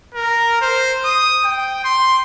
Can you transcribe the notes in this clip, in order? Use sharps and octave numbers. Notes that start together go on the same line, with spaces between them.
A#4
C5
D#6
G5
C6